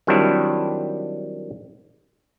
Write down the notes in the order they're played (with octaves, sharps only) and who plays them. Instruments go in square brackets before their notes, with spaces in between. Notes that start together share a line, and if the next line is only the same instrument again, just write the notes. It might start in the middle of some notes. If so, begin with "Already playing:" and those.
[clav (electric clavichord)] D#3 F#3 G3 C4 D4 E4